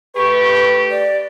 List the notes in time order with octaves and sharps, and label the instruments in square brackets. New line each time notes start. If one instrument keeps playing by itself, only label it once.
[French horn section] A3 G4 [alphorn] B4 [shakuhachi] C#6
[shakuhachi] D5